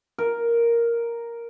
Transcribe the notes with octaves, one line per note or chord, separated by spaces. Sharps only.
A#4